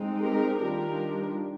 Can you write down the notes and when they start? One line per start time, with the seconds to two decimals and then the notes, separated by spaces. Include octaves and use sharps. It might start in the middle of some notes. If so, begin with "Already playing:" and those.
Already playing: G#3 C4 D#4
0.20 G4 A#4
0.58 D#3 G3 D4 F4 G4 A#4